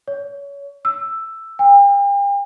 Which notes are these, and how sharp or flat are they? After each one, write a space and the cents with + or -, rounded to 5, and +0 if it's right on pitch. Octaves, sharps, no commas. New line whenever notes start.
C#5 +30
E6 +5
G5 +40